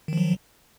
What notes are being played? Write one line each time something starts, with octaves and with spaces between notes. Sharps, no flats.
D#3 F3 F#3